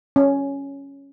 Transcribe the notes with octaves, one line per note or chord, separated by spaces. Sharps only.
C#4